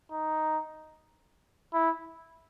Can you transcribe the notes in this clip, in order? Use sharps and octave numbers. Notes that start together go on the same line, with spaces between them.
D#4
E4